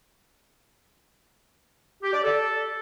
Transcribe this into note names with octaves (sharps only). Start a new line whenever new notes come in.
G4
D5
A4